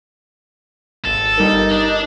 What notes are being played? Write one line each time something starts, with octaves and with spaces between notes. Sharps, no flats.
G#1 A4 E6
G1 G3 D#4 A#4
D4